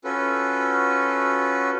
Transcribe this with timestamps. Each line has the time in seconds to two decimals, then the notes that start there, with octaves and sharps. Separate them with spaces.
0.04 C#4 F4 F#4 A4 B4